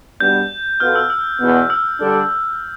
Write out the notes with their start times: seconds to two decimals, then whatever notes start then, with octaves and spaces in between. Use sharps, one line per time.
0.20 B2 G3 B3 D4 G6
0.80 B2 B3 F4 A4 F6
0.95 E6
1.10 E6
1.40 E2 B2 B3
1.70 E6
2.00 D3 G3 D4 A4